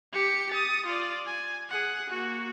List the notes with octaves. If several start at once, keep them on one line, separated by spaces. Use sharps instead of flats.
G4 C#7
D#6 A6
F4 D5
G#5
G#4 F#5
A#3 F#4